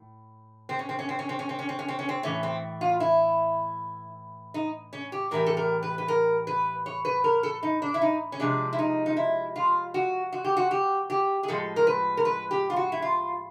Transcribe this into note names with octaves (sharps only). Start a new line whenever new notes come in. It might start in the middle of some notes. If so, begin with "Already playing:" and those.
Already playing: A2
C4
C#4
C4
C#4
C4
C#4
C4
C#4
C4
C#4
C4
C#4
C4
C#4
C4
A2 E3 A3 C#4
C4
F4
E4
D#4
C#4
G4
A2 E3 G3 A#4
A4
A#4
B4
B4
A#4
B4
C#5
B4
A#4
A4
D#4
D4
E4
D#4
C#4
C3 F3 G#3 D4
E4
D#4
D#4
E4
F4
F#4
F#4
G4
F#4
G4
G4
G#4
A2 F3 G#3 A4
A#4
B4
A#4
B4
G4
F4
F#4
E4
F4